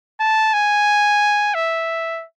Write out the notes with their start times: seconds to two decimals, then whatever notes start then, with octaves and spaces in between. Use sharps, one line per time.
0.20 A5
0.54 G#5
1.55 E5